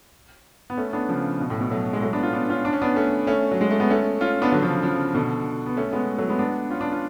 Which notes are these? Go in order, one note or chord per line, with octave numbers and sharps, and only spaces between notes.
B3
A3 C#4
B3 D4
C#3 F3
B2
A2
B2
F#3 A3
G#3
F#3 A3
B3 D4
C#4 F4
B3 D4
C#4 F4
D4
C#4
B3 D4
A3 C#4
A3 C#4
F#3
G#3
A3
B3
A3 C#4
C#4 F4
B3 D4
D3 F#3
C#3 F3
C#3 F3
B2 D3
B3
A3 C#4
G#3 B3
F#3 A3
G#3 B3
B3 D4
C#4 F4
B3 D4
C#4 F4